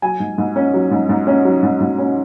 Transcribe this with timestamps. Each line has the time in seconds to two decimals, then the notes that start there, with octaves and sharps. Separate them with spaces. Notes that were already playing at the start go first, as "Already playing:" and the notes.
0.02 F#3 G#5
0.20 G#2
0.38 G#2
0.56 C#4
0.74 F#3
0.91 G#2
1.09 G#2
1.27 C#4
1.45 F#3
1.63 G#2
1.81 G#2
1.98 C#4